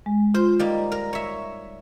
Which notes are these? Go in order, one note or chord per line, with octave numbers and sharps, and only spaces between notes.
G#3
F4 C5
G3 A#3 D#4
A#4
C#5 E5